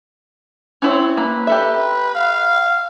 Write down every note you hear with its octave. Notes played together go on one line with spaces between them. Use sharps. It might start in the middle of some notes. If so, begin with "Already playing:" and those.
C4 C#4 E4 C#5
A#3 B4
G4 A4 E5
F5